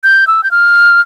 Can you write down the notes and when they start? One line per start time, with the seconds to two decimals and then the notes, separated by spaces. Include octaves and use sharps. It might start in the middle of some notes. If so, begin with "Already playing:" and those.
0.03 G6
0.27 E6
0.43 G6
0.51 F6